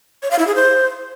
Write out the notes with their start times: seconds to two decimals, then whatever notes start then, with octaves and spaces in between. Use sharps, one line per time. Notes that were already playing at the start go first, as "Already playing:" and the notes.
0.22 C#5
0.31 F5
0.39 E4
0.47 G#4
0.55 C5